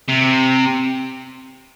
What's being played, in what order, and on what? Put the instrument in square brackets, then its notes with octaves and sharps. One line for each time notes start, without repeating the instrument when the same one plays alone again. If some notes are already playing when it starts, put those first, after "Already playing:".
[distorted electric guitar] C3